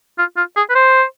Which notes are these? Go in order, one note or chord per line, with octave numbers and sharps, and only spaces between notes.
F4
F4
G#4
B4
C5